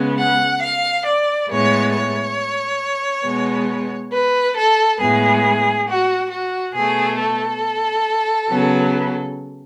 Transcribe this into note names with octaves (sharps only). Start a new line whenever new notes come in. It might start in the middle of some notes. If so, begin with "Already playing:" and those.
Already playing: C#3 G#3 B3
F#5
F5
D5
A2 G#3 B3 C#5
C#5
B2 G#3 B3
B4
A4
A2 G#3 B3 G#4
F#4
F#4
B2 A3 G#4
A4
C#3 F#3 B3